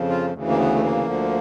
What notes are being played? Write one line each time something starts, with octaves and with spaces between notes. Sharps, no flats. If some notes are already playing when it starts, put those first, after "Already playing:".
Already playing: F2 C#3 F3
F4
D2 C#3 E3
A#3
B3
A3
A#3
D2 D3 F3